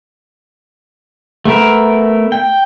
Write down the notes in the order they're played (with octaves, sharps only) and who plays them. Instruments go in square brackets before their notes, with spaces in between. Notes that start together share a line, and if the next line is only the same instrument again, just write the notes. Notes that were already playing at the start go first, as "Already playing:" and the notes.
[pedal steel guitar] A3 B3 A#4 E5
G5